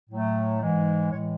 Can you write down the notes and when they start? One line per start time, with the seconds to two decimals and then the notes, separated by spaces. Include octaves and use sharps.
0.10 A2 F#3 A3
0.61 G#2 E3 G#3
1.12 A2 E3 G#3 C#5